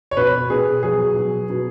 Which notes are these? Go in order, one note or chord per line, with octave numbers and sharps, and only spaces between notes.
C#5
B2 B4
B2 G#4
F#3 G#4
B2
B2